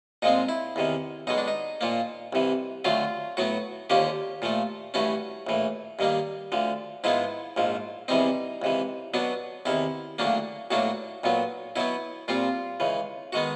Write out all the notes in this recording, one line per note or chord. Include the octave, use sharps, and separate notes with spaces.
A#2 F3 G#3 C4 D#4
E4
E2 C3 D#3
B1 B2 G#3 D#4
D4
D#4
A#2 F3 A#3
C2 C3 E3
D2 D3 F#3 A3 F4
A2 F#3 B3 F#4
D#2 D3 F3 A#3 C#4 G4
A#2 F3 A3
G2 E3 A3 C#4 F#4
A#1 A2 E3
G2 D#3 G3 A#3
D2 D3 F3
G#2 F3 G#3 B3 E4
A#1 G#2 F3
E2 C3 E3 G3 C4 D#4
C#2 C3 E3
B2 F#3 B3 D4
E2 C3 D#3 E4
D2 C#3 F#3 A#3 D4
B1 A2 F#3 A#3 D4 F#4
B1 A#2 F#3 B3
B2 F#3 B3 E4
A#2 G3 C4 F4
C#2 C#3 E3
D#3 G#3 B3 F#4